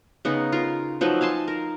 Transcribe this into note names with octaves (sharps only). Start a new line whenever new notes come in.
C#3 B3 D#4
F4 A#4
F3 F#3 D#4 B4
F5 G#5 A5 C6
A#4